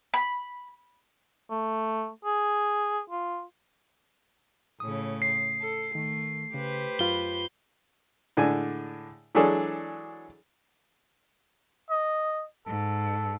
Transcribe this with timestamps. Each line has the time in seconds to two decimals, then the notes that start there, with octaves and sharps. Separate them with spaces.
0.14 B5
1.51 A3
2.25 G#4
3.10 F4
4.80 A2 C#3 D#6
5.22 C7
5.61 A4
5.95 D#3 A3
6.54 C#3 G4 B4 C5
6.99 F#2 F4 B5 G7
8.37 A2 D3 G#3 D4 G#5
9.35 E3 F#3 G#3 D4 G#4 A4
11.90 D#5
12.67 G#2 A4